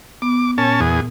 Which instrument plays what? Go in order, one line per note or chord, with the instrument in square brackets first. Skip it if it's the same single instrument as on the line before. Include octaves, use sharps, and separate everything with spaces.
[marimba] B3 [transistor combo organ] D6
[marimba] A#2 [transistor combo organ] C#4 A5
[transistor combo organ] E2 G#4